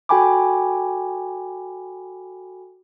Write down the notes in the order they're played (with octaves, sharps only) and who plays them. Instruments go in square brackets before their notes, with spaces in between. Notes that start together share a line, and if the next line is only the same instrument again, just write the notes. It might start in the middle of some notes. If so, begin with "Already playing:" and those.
[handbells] F#4 A4 G5 G#5 B5 D6